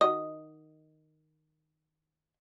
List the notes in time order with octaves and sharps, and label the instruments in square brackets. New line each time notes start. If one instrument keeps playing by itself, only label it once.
[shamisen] D#3 F#4 D#5 [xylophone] D#6